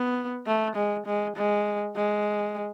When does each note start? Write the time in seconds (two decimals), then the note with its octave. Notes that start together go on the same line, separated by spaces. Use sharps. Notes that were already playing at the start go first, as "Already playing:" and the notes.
Already playing: B3
0.47 A3
0.76 G#3
1.06 G#3
1.36 G#3
1.96 G#3